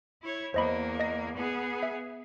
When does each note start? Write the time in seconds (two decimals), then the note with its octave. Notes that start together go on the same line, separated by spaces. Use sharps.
0.23 E4 C#5
0.54 E2 A#3 C5 D#5 B5
1.00 D#5 A#6
1.36 B3 G#4
1.83 E5